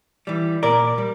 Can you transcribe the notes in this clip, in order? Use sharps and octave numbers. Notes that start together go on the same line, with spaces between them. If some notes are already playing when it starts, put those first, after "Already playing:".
E3 G3
A#2 A#4 D5
G3